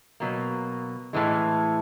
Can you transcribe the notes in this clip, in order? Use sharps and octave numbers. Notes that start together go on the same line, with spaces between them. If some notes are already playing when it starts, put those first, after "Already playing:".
B2 F#3 A#3
A2 E3 G#3